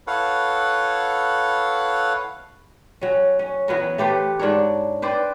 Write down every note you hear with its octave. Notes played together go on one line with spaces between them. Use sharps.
E4 A4 B4 C#5 F5 F#5
F#3 C#4
C#4
E3 F#3 B3 A#4
A3 G4 B4 C5
G#2 D4 A#4 C#5
B4 C5 D5 G5